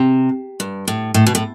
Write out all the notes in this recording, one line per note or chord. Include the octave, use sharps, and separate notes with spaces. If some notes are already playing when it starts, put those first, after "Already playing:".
Already playing: C3
G2
A2
A2
B2
A2